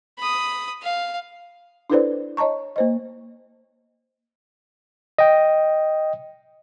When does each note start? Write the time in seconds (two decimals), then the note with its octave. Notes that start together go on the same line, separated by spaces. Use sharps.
0.18 B5 D#6
0.82 F5
1.90 D4 E4 A4 B4 C5 D5
2.37 C#5 D#5 A5 A#5 C#6
2.76 A#3 C5 D#5
5.18 D#5 G5